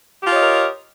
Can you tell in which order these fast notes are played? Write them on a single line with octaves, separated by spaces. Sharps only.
G4 F4 C#5 D#5 A#4